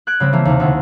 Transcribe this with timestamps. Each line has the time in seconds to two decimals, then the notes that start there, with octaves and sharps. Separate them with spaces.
0.07 F#6 G#6 D7
0.20 C#3 G3 C4
0.33 E3 A3 A#3
0.45 D#2 C3
0.60 D2 E4